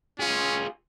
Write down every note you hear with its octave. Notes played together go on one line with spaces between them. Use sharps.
C#4 F4 G#4